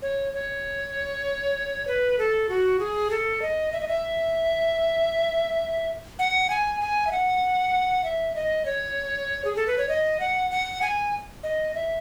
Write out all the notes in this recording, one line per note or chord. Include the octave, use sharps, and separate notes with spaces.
C#5
C#5
B4
A4
F#4
G#4
A4
D#5
E5
D#5
E5
F#5
G#5
G#5
E5
F#5
E5
D#5
C#5
G#4
A4
B4
C#5
D#5
F#5
F#5
G#5
D#5
E5